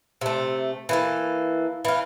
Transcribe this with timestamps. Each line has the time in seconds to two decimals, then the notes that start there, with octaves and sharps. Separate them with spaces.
0.21 C3 A3
0.89 E3 A#3 A4
1.85 E3 F4